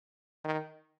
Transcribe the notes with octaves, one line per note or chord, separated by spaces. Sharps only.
D#3